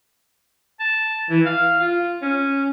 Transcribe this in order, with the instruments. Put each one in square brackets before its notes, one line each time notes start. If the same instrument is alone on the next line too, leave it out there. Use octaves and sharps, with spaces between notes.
[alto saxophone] A5
E3
F5
F4
C#4